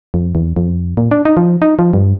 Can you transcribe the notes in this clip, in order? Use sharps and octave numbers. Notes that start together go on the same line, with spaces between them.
F2
E2
F2
A#2
D4
D#4
F3
D#4
F3
G2